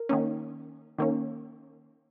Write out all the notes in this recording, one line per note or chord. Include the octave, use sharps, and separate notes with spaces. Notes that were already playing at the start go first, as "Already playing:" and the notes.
Already playing: A#4
D#3 A#3 C#4
D#3 A#3 C#4